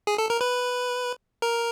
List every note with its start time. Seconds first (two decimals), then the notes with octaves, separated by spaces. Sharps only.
0.07 G#4
0.18 A4
0.30 A#4
0.41 B4
1.42 A#4